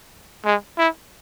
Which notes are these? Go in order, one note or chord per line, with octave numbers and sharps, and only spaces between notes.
G#3
E4